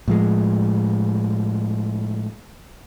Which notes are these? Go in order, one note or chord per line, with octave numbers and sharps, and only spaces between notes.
A2 F3 G#3